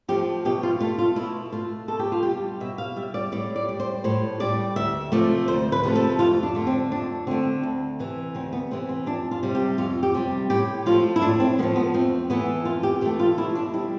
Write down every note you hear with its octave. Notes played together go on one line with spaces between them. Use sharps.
F3 A3 G4
B2 G4
F4
A3 F4
F4
B2 E4
A3 F4
B2 A4
G4
F4
G3 G4
B2 E5
F5
G3 E5
D5
A2 D5
D5
G3
C5
A2 C5
G3 D5
D2 E5
C3 F3 A3 D5
D2 C5
B4
C3 F3 A3
A4
F2 F4
D4
D3 A3
C4
F2 D4
D3 A3 C4
D2
C3 E3
D2 C4
B3
C3 E3 C4
C4
F2 D4
F4
C3 G3
G4
F2 F4
G4
C3 G3
A2 G4
F3 A3 F4
E4
A2 D4
C4
F3 A3 B3
B3
F2 C4
E3 A3 B3
F2 F4
G4
E3 A3 G4
F4
B2 E4
D4
G3 E4